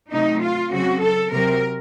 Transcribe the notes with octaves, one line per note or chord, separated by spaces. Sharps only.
C3 F#3 A3 D#4
F4
C#3 F#3 C4 F#4
A4
C3 F#3 C4 A#4